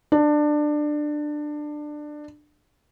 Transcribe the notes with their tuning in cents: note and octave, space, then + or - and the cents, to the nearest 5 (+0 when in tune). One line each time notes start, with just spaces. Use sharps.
D4 +20